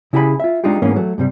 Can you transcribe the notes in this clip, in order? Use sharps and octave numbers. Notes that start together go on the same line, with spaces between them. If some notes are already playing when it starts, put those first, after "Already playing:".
C#3 E4 G4 G#4 F5 B5
F4 E5
G#3 D4 D#4 F4 G4
G#2 E3 A#3 B3 C#4
F#3 A3
G2 C3 G3